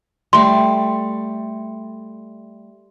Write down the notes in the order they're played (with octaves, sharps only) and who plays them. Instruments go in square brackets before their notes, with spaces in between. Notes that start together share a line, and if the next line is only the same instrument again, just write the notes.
[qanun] G3 A3 [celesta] C6